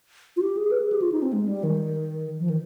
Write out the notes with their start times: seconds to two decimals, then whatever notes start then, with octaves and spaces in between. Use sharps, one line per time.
0.37 F4
0.42 G4
0.57 G#4
0.71 B4
0.82 G#4
0.92 G4
1.02 F4
1.12 D#4
1.22 C4
1.33 G#3
1.48 G3
1.63 D#3
2.39 F3
2.49 D#3